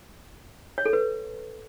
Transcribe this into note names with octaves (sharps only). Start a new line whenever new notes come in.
C#5
A4
B4